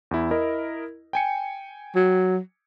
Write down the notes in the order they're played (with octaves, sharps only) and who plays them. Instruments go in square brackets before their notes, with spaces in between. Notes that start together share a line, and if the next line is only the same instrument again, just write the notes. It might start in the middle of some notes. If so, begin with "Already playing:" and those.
[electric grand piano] E2 E4
E4 A#4 D#5
G5 G#5 C#7
[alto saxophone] F#3